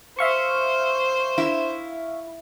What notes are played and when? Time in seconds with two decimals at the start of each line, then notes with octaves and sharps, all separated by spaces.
0.19 C5 E5 F5 C#6
1.38 E4